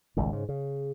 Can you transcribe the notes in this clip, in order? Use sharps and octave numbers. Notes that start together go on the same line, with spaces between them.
G#1 C#2 A2
G#2 C#3
C#3